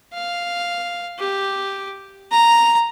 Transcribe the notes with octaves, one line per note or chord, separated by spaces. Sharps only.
F5
G4
A#5